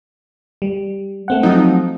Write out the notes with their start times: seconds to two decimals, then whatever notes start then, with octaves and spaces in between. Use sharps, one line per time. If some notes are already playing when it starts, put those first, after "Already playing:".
0.62 G3
1.28 A3 C4 F#5
1.43 F3 F#3 D#4